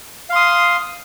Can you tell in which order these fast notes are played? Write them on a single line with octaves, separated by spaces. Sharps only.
F5 C6 D#6